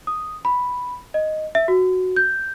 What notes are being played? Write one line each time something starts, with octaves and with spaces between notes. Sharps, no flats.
D#6
B5
D#5
E5
F#4
G6